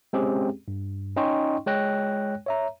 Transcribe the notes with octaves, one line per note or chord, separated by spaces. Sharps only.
G#3 C4 C#4 G4 G#4
G2
C#4 D#4 D#5 G5 C6 C#6
G#3 C#5 G5 F#6 A#6
C#5 E5 A#5